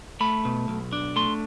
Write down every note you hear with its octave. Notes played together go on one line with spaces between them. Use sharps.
A3 B5
B2
B1
D4
A3 C6